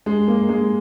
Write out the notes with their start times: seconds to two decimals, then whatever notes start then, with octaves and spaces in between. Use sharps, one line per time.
0.06 G#3
0.28 A#3
0.49 G#3